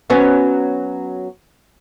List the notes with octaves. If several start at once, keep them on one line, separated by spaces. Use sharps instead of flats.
F#3 B3 C#4